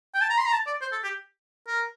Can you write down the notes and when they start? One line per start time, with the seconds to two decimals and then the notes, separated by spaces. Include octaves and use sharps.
0.15 G5
0.21 A5
0.30 A#5
0.38 C6
0.46 A#5
0.53 A5
0.67 D5
0.82 C5
0.92 A4
1.03 G4
1.67 A#4